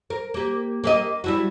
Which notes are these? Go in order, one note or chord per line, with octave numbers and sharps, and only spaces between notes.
A#4
A#3 G4
A#3 G4 D#5
G3 E4 F#4